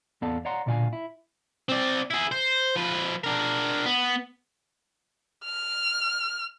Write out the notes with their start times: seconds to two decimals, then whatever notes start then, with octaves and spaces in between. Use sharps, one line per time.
0.22 E2 B3 A4 D5 F5 A5
0.45 C#5 D5 F5 F#5 A#5 C6
0.66 B1 A#2 D3 D5 F5 G#5
0.93 E4
1.69 C4 D5
2.11 E4 G#4
2.32 C5
2.76 F3 B4
3.24 D4 A#4
3.85 B3
5.45 F6